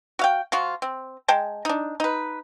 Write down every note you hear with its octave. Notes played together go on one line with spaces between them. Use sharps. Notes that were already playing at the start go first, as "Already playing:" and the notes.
F#4 F5 G5
F3 F4 F#4
C4
G#3 G5 A5
D4 D#4
D#4 B4